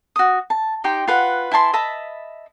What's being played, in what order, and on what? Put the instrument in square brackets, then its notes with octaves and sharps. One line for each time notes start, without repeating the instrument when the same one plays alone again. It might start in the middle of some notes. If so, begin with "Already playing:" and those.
[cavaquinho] F#4 D#6
A5
D#4 G4 G5 C6
F4 B4 F#5
E4 G#5 A5 C6
D#5 E5 A5 B5